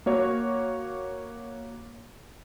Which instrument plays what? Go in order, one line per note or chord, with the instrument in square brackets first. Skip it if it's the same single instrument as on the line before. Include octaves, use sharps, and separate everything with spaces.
[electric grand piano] A#3 F#4 C#5